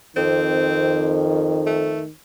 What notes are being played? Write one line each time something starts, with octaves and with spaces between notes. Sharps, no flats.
F2 D#3 C4
A3